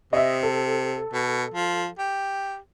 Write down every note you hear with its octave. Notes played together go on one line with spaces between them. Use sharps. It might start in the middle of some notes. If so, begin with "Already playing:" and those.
C3 D#5 E5
A4
B2
F3
G4